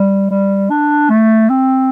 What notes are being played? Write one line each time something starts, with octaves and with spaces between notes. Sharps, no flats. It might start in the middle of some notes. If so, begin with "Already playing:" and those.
Already playing: G3
G3
D4
A3
C4